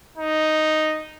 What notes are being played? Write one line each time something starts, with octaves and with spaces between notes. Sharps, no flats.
D#4